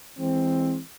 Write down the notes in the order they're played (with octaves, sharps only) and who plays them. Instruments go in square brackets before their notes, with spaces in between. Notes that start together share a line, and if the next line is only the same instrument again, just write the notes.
[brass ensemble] E3 G#3 C4